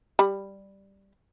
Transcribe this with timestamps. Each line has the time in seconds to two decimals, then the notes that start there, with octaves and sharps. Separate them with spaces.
0.19 G3 B5